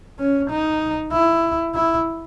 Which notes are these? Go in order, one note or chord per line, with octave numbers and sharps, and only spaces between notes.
C#4
D#4
E4
E4